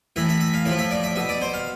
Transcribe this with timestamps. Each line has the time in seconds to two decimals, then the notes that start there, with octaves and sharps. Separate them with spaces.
0.16 A2 E3 E5
0.29 E5
0.40 E5
0.54 F5
0.65 A2 F3 E5
0.79 E5
0.91 D5
1.03 E5
1.16 B2 E5
1.29 D5
1.42 C5
1.54 F5